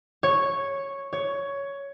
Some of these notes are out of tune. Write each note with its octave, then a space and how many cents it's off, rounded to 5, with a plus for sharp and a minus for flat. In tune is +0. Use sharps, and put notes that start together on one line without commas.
C#5 -5
C#5 +10